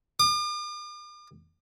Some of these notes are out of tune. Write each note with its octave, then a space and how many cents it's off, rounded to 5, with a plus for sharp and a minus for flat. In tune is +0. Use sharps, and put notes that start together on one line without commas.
D6 +45